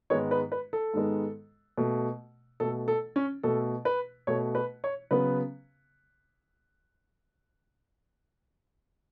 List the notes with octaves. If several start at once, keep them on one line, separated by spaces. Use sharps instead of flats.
G#2 D#3 G#3 B3 C#5
B4
B4
A4
G#2 D#3 G#3 B3
B2 A3
B2 A3 A4
A4
C#4
B2 A3 A4
B4
B2 A3 C#5
B4
C#5
C#3 F#3 B3 B4